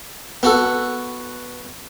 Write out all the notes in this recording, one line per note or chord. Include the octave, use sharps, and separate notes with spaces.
B3 F#4 A4